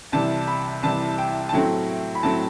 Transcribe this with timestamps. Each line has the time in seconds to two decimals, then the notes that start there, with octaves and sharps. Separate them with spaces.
0.12 C2 C3 E3 G3 A5
0.47 B5
0.83 C2 C3 E3 G3 A5
1.18 G5
1.49 A5
1.53 A2 F#3 A3 C4 G5
2.15 B5
2.23 A2 F#3 A3 C4 A5